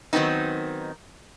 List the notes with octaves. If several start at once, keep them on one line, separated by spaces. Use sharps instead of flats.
D#3 F#3 B3 C4 D#4